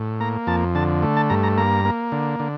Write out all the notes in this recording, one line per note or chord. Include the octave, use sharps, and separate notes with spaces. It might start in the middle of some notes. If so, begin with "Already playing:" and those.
Already playing: A2
A#3 A#5
F2 A5
D3 A5
A3
A5
G2 A#5
A#5
A#3 A#5
A#3
D3
D3